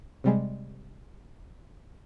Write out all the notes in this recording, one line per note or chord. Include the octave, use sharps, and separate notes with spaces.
C3 G3 G#3